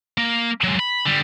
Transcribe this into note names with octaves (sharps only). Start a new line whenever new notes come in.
A#3
F#3 G#3
B5
D3 G3